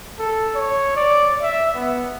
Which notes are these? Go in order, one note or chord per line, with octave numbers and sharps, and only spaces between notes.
A4
C#5
D5
E5
B3